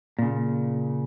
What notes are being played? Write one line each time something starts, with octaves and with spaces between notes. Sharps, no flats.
A#2 C#3